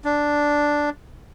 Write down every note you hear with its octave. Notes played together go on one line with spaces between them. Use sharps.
D4